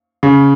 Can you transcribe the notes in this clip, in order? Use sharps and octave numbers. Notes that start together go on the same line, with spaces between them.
C#3